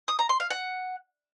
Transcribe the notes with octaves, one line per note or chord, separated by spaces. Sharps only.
D#6
A#5
C6
F5
F#5